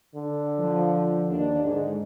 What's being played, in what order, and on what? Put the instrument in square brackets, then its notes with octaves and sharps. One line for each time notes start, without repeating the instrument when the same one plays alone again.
[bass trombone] D3
[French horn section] F3
D#2 D4
G#2 D3